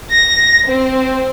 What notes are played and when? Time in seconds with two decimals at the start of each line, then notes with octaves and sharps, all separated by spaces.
0.11 A#6
0.67 C4